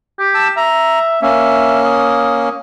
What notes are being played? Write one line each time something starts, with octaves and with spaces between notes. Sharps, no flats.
G4
A5 E6
E5 A#5
A#3 C#4 E5
D#6